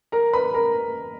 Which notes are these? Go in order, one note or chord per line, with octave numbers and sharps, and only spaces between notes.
A#4 A#5
B4 B5
A#4 A#5